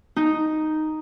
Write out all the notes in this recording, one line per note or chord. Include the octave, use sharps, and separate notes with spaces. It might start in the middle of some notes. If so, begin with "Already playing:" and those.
D#4